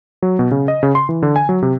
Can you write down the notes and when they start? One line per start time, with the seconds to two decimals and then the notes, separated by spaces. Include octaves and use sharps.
0.22 F#3
0.39 B2
0.51 C#3
0.68 D#5
0.83 C#3
0.95 C6
1.09 E3
1.23 D3
1.36 G#5
1.49 F#3
1.62 C3